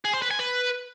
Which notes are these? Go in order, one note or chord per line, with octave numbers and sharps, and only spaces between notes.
G#4
C5
B4
G#5
B4